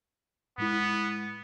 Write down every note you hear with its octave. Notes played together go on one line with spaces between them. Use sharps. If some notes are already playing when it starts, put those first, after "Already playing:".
A2 G#3 B3 E4